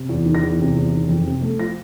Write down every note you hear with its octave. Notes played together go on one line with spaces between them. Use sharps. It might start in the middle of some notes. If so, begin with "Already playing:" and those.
Already playing: C3
E2
D#3
A#6
E2
C3
E2
D#3
F2
C3
A3
F3 A#6